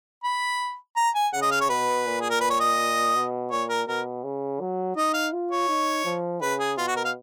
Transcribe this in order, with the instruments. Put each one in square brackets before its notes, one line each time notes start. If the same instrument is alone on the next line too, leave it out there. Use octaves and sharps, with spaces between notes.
[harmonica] B5
A#5
G#5
[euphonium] C#3 [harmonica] F#5
[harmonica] D#5
F5
C#5
[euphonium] B2 [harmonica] B4
[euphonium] A#2
[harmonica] G#4
A#4
B4
C#5
D#5
[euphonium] B2
[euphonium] A#2 [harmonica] C#5
[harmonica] A#4
[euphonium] B2 [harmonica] A#4
[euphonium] C#3
F#3
[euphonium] D#4 [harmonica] D#5
[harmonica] F5
[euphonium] F4
[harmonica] C#5
[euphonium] D#4
F3
[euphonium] C#3 [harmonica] B4
[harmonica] G#4
[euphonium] B2 [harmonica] F4
[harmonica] F#4
A#4
F5